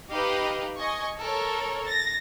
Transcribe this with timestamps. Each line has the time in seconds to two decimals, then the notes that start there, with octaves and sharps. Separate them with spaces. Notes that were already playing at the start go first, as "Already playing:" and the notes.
0.10 D#4 G4 B4 D#5 F5
0.79 D#5 G#5 C#6
1.19 A4 A#4 C#5
1.86 A6 A#6